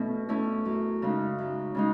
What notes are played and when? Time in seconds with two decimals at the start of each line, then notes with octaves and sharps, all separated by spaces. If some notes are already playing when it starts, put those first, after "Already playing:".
Already playing: B2 A3 C#4 E4
0.29 A3 C#4 E4
0.65 F#2
1.02 C#3 G#3 D#4
1.38 F#2
1.75 C#3 G#3 D#4